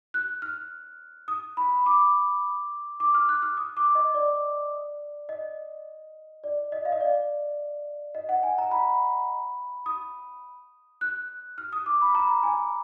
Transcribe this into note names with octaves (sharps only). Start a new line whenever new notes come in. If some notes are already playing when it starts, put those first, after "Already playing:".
F#6
F6
D#6
B5
D6
D6
F6
F#6
F6
D#6
D6
D#5
D5
D#5
D5
D#5
F5
D#5
D5
D#5
F#5
G#5
A#5
B5
D#6
F#6
F6
D#6
D6
B5
A#5
G#5